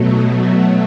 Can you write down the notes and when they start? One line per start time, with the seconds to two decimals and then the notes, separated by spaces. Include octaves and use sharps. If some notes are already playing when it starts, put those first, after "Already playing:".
Already playing: B2 F#3 A3
0.09 D#4 D#5
0.37 E4 E5